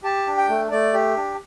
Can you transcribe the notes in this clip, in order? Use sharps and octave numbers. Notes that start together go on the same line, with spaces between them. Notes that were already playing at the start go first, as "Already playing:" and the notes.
G4 A5
D4
G5
A3
A3 D5
G4
D4